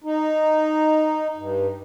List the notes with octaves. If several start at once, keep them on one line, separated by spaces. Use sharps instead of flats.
D#4
G2